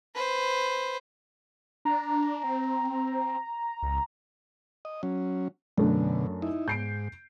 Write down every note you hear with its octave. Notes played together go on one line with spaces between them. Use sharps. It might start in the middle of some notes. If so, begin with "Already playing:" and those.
B4 C5
D4 A#5
C4
C#2
D#5
F#3 C#4
F#2 B2 D3 A3 D4
D#4 E4
G#2 G6 C7 D7